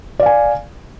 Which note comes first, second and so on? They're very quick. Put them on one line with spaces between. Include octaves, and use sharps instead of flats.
D5 F5 G#5